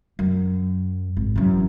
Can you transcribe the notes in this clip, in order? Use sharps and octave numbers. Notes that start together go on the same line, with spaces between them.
F#2
G#1
F#2 E3